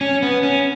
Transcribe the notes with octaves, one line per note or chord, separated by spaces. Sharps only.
C#4
B3
C#4